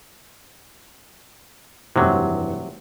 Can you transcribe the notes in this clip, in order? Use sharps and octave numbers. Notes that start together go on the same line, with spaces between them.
F1 G2 C3 E3 F#3